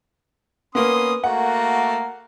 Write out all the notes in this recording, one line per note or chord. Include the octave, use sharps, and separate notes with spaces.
A#3 B3 C#4 C6 D#6
A3 A#3 F#4 F#5